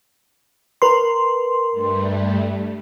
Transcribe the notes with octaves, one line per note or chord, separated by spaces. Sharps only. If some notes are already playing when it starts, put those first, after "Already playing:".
A#4 B4 C6
G2 G3 A3